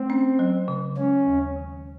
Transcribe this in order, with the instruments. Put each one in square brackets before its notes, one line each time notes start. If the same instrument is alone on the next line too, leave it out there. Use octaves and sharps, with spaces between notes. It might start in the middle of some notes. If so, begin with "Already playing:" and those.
Already playing: [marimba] A3 [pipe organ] C4
[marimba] C#4
F#3
C#3
[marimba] G#3 [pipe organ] C#4
[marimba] D#2
D#3